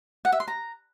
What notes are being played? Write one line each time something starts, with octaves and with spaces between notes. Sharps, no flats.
F#5
E5
C6
A#5